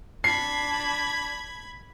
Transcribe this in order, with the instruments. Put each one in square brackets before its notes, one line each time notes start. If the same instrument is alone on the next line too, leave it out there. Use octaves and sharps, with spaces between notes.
[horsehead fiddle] D4 A5 [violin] B5 G#6 [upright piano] C7